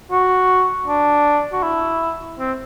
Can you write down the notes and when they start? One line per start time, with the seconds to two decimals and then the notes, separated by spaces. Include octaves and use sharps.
0.11 F#4
0.88 D4
1.52 F#4
1.63 E4
2.39 C4